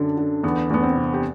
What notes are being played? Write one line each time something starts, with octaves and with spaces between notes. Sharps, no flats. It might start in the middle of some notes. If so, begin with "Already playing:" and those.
Already playing: F#2 D3 D4
D3
E2 B3
E2 B3
C4
C3
G4